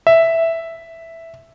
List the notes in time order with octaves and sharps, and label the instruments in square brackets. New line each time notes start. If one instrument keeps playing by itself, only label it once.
[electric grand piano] E5